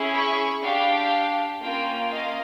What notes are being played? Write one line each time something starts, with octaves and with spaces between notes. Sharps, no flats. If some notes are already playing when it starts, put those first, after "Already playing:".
Already playing: C#4 E4 G#4
B5 C#6
D4 G4 F5 G5
A#3 C#4 F4 F5 G5
D#5 F5